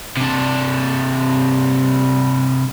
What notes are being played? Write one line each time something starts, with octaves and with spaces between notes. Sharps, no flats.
C3 D4